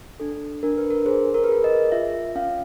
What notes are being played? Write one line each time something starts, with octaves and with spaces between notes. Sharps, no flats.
D4 A4
D4 A#4
B4
A#4
G#4 C5
A#4
B4
G#4 A#4
D#5
F4 E5
C#4 F5